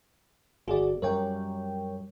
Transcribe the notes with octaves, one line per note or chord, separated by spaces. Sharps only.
G1 F#4 G#4 D5
F#2 G3 A#4 C#5 G5